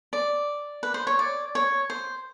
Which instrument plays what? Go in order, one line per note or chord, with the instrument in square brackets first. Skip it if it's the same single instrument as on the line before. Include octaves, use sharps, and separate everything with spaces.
[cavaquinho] D5
B4
C5
C#5
D5
C#5
C5